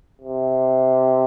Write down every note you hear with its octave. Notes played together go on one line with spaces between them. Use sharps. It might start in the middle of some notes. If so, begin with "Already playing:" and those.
C3